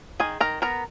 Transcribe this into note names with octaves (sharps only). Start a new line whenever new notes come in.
D#3 G#4 G#5
D#3 A#4 A#5
B3 A#4 A#5